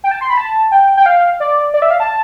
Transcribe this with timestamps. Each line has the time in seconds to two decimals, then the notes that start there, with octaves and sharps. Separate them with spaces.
0.04 G5
0.11 A5
0.21 C6
0.30 B5
0.37 A5
0.72 G5
0.97 G5
1.06 F5
1.40 D5
1.74 D5
1.82 E5
1.91 F5
2.00 A5